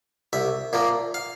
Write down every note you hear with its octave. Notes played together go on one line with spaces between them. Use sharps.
C2 E5
A#2 F3 A#3
F5